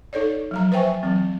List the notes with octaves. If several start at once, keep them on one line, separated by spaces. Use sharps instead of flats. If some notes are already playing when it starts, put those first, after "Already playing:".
D#4 A4 C#5 D5
F3 F#3 A#5
B4 C5 E5 G5 G#5 C#6
E3 F#3 C4